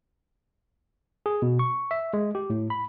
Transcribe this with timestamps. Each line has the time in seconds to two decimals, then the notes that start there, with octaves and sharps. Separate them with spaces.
1.26 G#4
1.42 B2
1.59 C#6
1.91 E5
2.13 G#3
2.35 G4
2.50 A2
2.70 B5